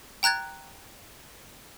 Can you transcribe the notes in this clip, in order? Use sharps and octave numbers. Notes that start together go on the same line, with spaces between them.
G5 A#5 F#6 G#6 A6